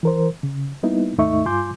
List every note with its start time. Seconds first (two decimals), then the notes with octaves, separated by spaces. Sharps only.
0.03 E3 A#4 C5
0.43 C#3
0.83 G3 A#3 B3 D#4 E4
1.18 D#2 G#2 A3 D#4 E5 C#6
1.46 G2 F4 G#5 C6 D6 G6